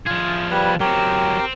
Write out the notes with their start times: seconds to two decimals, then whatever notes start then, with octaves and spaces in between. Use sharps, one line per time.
0.06 F3 F4 G#4
0.51 G3 B4
0.80 F#3 C4 G4 A#4
1.38 C4